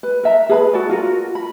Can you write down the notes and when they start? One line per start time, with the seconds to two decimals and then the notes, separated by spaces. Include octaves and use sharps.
0.03 B4
0.23 A#4 E5 A#5
0.49 G#4 B4 A#5 B5
0.73 F#4 A4 D5
0.90 F4 F#4 A#4
1.35 B5